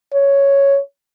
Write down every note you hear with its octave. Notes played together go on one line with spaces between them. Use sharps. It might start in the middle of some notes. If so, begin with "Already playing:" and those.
C#5